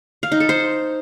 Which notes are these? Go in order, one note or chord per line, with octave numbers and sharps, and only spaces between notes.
F5
D#4
A4
C5